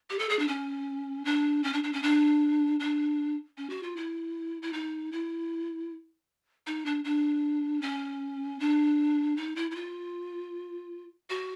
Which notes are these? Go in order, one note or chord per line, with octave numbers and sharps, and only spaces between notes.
G4
A4
G#4
D4
C#4
D4
C#4
D4
D4
C#4
D4
D4
C#4
F#4
F4
E4
E4
D#4
E4
D#4
D4
D4
C#4
D4
D#4
E4
E4
F4
F#4